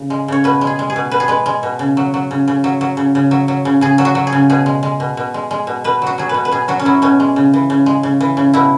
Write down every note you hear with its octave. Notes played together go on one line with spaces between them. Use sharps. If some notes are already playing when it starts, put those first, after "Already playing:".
Already playing: C#3
G#3
C#3 C#5
B2 B4
G#3
G#4
G#3
G#4
B2
B2 B4
G#4
G#3 B4
G#3
B2
C#3
F#3
F#3
C#3
C#3
F#3
F#3
C#3
C#3
F#3
F#3
C#3
C#3 G#4
F#3
F#4
F#3
G#4
C#3
B2 G#4
G#3
G#3
B2
B2
G#3
G#3
B2
B2 B4
F#3 F#4
F#3 G#4
B2 B4
B4
B2 G#4
F#3 F#4
C#4
F#3 E4
B2 C#4
G#3
C#3
E3
C#3
G#3
C#3
E3
C#3
B2 E4